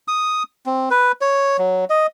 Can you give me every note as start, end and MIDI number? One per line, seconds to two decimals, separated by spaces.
0.08 0.43 87
0.66 0.89 60
0.90 1.12 71
1.21 1.57 73
1.59 1.85 54
1.90 2.07 75